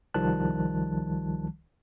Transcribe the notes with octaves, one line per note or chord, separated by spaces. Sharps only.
C2 D#3 F3 G3 A5 F#6